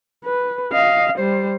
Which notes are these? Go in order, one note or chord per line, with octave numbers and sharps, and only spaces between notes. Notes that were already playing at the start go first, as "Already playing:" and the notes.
B4
D#5 F5
G3 C5